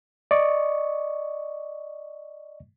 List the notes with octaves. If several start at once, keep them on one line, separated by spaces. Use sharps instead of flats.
D5 D#5 C#6